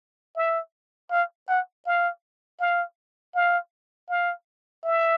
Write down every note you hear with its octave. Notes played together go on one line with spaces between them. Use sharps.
E5
F5
F#5
F5
F5
F5
F5
E5